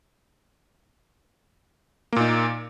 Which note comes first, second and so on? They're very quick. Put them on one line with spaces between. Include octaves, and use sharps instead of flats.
A#3 A#2 D#4